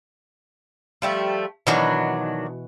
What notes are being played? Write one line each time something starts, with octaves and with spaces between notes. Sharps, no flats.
F3 G3 A3
B2 D#3 E3 F#3 D4 F#4